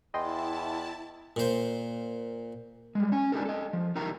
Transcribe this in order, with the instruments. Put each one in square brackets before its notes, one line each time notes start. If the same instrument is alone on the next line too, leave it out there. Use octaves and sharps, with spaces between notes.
[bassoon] E2 [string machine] E4 A5 [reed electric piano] D#5 G5 C6
[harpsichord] A#2 C5
[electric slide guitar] G3 G#3
C#4 G#5
D4 D#4 G4 A4 A#4
A4 D#5
F3
D#4 E4 G4 A#4 G5 A#5